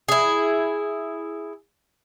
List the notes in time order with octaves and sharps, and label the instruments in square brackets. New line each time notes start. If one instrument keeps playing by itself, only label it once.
[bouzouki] E4 G#4